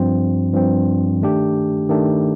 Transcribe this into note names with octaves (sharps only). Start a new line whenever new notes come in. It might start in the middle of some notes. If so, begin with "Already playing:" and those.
Already playing: G2 F3 C4
G2 F3 C4
D#3 A3 D4 G4
D#3 A3 D4 G4